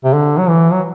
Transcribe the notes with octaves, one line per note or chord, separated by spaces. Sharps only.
C3
D3
F#3
E3
F#3